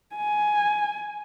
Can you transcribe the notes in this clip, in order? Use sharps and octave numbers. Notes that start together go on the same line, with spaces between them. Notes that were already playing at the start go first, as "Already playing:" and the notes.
G#5